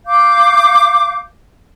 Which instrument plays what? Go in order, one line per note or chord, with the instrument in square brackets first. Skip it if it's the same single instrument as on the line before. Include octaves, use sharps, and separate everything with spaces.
[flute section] F5 D6 G6